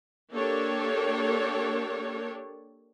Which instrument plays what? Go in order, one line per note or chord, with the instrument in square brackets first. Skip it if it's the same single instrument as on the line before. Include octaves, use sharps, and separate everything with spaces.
[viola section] A#3 D4 G4 A4 C#5